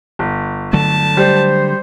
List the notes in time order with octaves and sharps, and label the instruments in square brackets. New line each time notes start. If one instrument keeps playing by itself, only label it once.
[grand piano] G1
[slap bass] D3 F#3 A3 [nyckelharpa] A5
[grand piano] G3 [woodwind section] C5